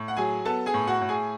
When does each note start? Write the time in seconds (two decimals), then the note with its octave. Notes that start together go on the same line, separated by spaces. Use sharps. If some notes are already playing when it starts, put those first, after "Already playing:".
Already playing: A2
0.08 F#5
0.17 F#3 G#4 G#5
0.45 B3 A4 A5
0.66 G#4 G#5
0.74 A2
0.87 F#4 F#5
1.02 A2
1.09 G#4 G#5